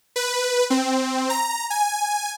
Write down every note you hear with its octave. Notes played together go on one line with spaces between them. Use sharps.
B4
C4
A#5
G#5